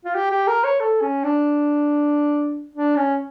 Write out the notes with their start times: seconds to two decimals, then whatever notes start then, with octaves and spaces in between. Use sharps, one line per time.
0.05 F4
0.15 G4
0.31 G4
0.48 A#4
0.64 C#5
0.80 A4
1.01 C#4
1.24 D4
2.75 D4
2.96 C#4